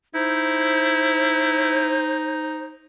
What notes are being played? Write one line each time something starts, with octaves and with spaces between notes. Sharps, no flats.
D#4 E4 C5